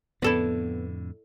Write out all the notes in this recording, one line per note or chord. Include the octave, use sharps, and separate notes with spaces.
F2 A2 D3 B3 E4 A4 D5